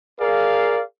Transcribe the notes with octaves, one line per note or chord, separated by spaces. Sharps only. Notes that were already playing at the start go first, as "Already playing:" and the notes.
G#4 A#4 D5 F5